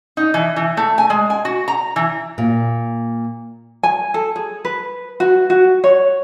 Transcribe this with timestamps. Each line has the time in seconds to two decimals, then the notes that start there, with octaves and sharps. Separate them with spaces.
0.17 D#4
0.34 E3
0.56 E3
0.77 A3
0.98 G#5
1.10 G#3
1.30 G#5
1.45 F#4
1.68 A#5
1.96 E3
2.38 A#2
3.83 G#5
4.14 A4
4.36 G#4
4.65 B4
5.20 F#4
5.50 F#4
5.84 C#5